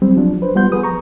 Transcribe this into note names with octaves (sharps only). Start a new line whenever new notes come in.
F#3 G3 C4
F3 F#3 D4
B4 C5
G3 B3 F4 F#5 C6 G6
F3 G#4 B4 D#6
A#5 C#6